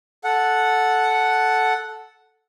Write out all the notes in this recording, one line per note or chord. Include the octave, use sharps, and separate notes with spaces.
A4 F#5